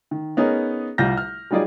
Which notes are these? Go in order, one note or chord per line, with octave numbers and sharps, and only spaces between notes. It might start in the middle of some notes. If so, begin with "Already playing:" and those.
D#3
B3 C#4 D#4 G#4 A#4
C2 G3 F4 F6 G6 A#6
F6
F#3 G3 D#4 F4 G#4 D5